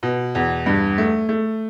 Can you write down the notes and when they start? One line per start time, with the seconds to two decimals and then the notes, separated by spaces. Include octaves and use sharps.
0.03 B2
0.35 E2
0.66 G2
0.98 A3
1.29 A3